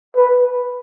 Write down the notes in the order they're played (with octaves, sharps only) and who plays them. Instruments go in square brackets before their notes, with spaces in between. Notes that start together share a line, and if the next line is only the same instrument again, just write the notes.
[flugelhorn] B4